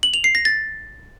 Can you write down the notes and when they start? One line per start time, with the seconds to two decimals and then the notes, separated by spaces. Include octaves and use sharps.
0.03 F#7
0.14 F7
0.24 C7
0.35 A#6
0.45 A6